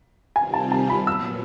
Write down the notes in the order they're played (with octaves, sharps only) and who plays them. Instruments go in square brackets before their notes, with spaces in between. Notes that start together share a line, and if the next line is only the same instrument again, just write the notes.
[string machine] C3 D#3 G3 C4 F4 [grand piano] G#5
[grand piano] A5
A5
B5
[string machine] A#2 F#3 B3 [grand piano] E6